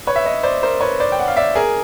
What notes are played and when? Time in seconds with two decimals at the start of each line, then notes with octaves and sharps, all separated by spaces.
0.07 B4 C#5
0.16 E5
0.26 C#5 D#5
0.43 C5 D5
0.63 A#4 C5
0.81 B4 C#5
1.00 C5 D5
1.12 G5
1.20 F#5
1.28 F5
1.36 D5 E5
1.55 G#4 A#4